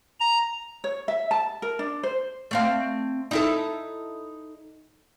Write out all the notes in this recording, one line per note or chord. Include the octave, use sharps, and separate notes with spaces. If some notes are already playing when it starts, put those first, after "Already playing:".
A#5
C#5
E5
A5
A#4
D4
C5
A3 C4 F5
D#4 E4 A4